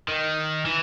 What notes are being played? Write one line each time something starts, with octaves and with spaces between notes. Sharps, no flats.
D#3
E3